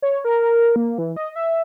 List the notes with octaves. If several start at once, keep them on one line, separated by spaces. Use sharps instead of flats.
C#5
A#4
A#3
E3
D#5
E5